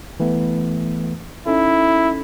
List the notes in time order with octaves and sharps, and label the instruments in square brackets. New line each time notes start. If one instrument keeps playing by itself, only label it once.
[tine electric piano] E3 A3 B3
[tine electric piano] C#4 D#4 A4 [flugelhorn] E4